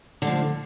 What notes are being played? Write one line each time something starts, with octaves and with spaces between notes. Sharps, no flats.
D3 F3 A3